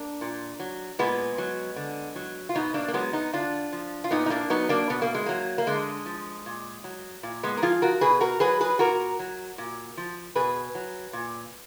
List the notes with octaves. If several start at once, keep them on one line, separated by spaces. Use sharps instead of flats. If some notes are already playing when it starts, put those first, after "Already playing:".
Already playing: A#3 D4
A#2
F#3
A#2 G#3 B3
F#3
D3
F#3
F4
B2 B3 D#4
A#3 D4
A#3
F#3 G#3 B3
B3 D#4
D3 D4 F4
F3
F4
A#2 B3 D#4
D#4
A#3 D4
F#3 B3 D#4
A#3 D4
B2 B3
A#3
G#3
F#3 A#3
A#3
D3 G#3
F3
A#2
F#3
A#2
G#3 B3
A#4
F3 F4 G#4
F#4 A#4
B2 G#4 B4
F#4 A#4
F#3 G#4 B4
G#4 B4
A#2 F#4 A#4
F#3
A#2
F3
B2 G#4 B4
F#3
A#2